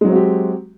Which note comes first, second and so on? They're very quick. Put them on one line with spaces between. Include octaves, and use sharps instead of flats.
G#3 F#3 C4 F#4 G4